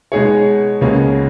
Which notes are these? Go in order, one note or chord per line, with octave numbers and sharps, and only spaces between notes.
B2 G#3 D#4 G#4 C#5
C#2 B2 A#3 C#4 G#4